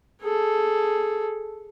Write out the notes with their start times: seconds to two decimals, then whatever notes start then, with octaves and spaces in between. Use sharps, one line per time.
0.23 G#4 A4